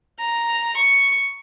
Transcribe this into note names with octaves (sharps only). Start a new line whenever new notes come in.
A#5
C#6